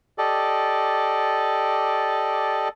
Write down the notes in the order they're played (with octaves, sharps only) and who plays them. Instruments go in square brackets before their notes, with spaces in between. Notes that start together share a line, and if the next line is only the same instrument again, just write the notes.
[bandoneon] G4 A4 D5 D#5